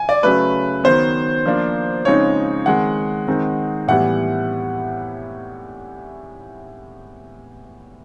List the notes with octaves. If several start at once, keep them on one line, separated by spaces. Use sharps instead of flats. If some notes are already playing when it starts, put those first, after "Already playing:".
Already playing: G#5
D5
C#3 F#3 A3 B4
D#3 F#3 B3 C5
F3 A#3 D4
C#3 F3 G#3 C4 D#4 C#5
D#3 G#3 C4 F#5
D#3 G#3 C4 D#4
A2 E3 G3 B3 F#5